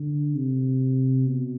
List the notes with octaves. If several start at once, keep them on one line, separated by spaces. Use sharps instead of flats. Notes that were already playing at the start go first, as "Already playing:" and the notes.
Already playing: D3
C3
B2